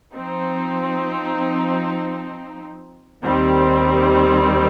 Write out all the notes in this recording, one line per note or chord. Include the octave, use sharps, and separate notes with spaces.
F3 C4 D#4
D#2 D#3 G3 C4